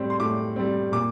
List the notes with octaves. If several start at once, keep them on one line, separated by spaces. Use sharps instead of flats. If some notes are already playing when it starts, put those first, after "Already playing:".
Already playing: A2 G3 C4
C6
A2 D6
G3 C4
A#2 D6